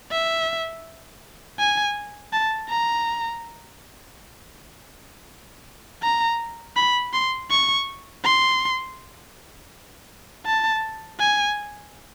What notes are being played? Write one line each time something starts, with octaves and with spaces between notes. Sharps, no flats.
E5
G#5
A5
A#5
A#5
B5
C6
C#6
C6
A5
G#5